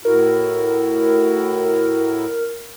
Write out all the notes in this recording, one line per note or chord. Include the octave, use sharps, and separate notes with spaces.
A2 E4 F#4 A#4